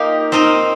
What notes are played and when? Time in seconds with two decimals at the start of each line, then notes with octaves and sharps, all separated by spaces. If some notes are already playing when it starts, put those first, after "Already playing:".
Already playing: A#3 D#4 F4 G4
0.32 C4 D#4 A#4 D#5